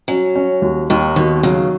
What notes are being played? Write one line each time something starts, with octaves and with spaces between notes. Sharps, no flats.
F#3 C#4
C#4
D#2
D#2 D#3
B2 D#3
C#3 F#3